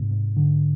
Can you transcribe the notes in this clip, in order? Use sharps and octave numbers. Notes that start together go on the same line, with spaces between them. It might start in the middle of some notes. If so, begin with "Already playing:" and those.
Already playing: G#2 C3
G#2
D3